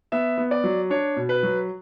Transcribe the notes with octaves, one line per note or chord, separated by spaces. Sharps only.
B3 E5
B3
D5
F#3
D4 C#5
B2
B4
F#3